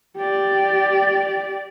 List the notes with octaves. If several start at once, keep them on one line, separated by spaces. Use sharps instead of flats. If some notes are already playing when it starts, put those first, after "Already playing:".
G4 D5